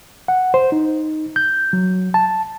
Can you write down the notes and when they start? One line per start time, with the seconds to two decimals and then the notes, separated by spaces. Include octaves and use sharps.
0.28 F#5
0.54 C5
0.72 D#4
1.36 G6
1.73 F#3
2.14 A5